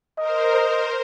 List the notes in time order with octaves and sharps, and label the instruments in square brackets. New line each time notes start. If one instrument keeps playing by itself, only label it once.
[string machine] A#4 C5 [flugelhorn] D#5